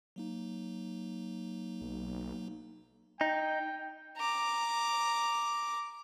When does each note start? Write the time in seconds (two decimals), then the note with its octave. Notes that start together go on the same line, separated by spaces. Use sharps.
0.16 F#3 A#3 D#4
1.81 B1
3.21 D#4 G5
4.17 A#5 D6